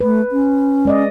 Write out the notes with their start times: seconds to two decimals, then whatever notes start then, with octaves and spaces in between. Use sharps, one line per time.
0.01 A3 B4
0.32 C#4
0.85 G#3 D5 D#5